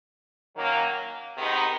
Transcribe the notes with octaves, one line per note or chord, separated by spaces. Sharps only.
D#3 F#3 A#3 C#4
C3 D#3 G#3 B3 D#4